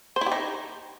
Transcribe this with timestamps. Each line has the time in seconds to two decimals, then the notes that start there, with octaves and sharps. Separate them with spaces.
0.16 C5
0.21 E4
0.26 G4
0.32 D#4